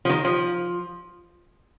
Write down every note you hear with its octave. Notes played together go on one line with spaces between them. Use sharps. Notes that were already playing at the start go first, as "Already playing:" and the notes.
F3
D#3
F3